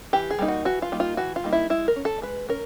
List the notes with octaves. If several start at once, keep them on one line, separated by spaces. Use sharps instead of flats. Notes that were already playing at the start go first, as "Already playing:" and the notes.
E3 G4
G#4
G3 A#3 D#4
F#4
E3 F#4
F4
G3 A#3 D#4
F4
E3 F#4
F4
G3 A#3 D#4
E4
G#3 E4
A#4
C#4
A4
G#3 B4
C#4 A#4